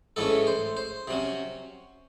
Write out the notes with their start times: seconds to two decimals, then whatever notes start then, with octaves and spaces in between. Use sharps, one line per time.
0.16 G#2 E3 A3 C#4 A4
0.47 C5
0.77 C5
1.07 C3 F#3 C#4